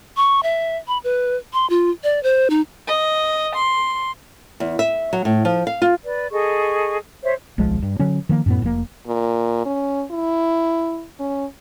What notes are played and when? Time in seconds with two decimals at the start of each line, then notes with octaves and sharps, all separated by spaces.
0.17 C#6
0.43 E5
0.88 B5
1.04 B4
1.53 C6
1.70 F4
2.04 D5
2.23 C5
2.50 D#4
2.86 D#5
3.55 C6
4.60 E2
4.79 E5
5.13 F#3
5.25 A2
5.45 F3
5.67 F5
5.82 F4
6.05 B4 D5
6.31 G#4 A4 D#5 C#6
7.23 C5 C#5 E5
7.58 D1 B1 F3 G#3
7.83 G2
8.00 D3 F#3 C#4
8.29 D#3 F3 A#3
8.46 F#2 A2 B3
8.62 F1 A#3
9.08 A#2
9.66 C#4
10.11 E4
11.20 C#4